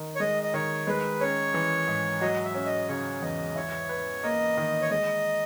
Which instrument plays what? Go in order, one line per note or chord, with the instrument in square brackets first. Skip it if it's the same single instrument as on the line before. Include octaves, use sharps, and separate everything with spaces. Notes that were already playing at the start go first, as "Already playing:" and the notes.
Already playing: [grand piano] D#3
[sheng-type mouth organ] C#5
[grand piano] G#3 [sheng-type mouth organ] D#5
[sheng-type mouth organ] D#5
[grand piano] D#3 [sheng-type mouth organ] C#5
[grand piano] G#3 [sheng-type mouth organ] B4
[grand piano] C#4 [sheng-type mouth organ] C#5
[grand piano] E3
G#2
[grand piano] F#3 [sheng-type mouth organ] D#5
[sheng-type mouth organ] E5
[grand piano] C#4
[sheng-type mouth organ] D#5
[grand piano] C#3 [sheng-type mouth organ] C#5
[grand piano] E2 [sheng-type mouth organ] D#5
[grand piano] E4 [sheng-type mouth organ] C#5
[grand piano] B4
[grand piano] A#3 [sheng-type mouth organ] D#5
[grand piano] D#3
[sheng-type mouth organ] C#5
[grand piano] G#3 [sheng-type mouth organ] D#5